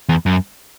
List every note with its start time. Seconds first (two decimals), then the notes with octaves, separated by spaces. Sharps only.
0.09 E2
0.26 F#2